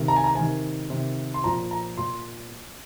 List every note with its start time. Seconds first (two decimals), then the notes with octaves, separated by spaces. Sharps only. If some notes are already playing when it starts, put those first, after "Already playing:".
Already playing: C3 D#3
0.08 A#5
0.16 G#5
0.24 A#5
0.35 C3 D#3 G#5
0.90 C3 D#3
1.34 C6
1.44 A#2 F3 A#5
1.71 A#5
1.97 A#2 C6